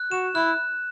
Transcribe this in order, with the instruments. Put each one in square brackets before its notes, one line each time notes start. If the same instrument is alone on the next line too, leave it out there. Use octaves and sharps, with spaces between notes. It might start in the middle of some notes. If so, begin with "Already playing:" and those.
Already playing: [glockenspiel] F#6
[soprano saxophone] F#4 [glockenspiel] E7
[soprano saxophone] E4 [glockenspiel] F#6